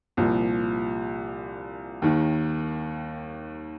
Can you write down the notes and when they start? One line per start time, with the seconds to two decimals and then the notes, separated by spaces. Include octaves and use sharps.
0.17 C2 A#2 F3
2.02 D#2 D#3